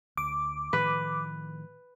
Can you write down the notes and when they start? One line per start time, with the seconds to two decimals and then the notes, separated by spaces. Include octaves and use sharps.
0.17 D2 D6
0.73 A2 D#3 F3 B4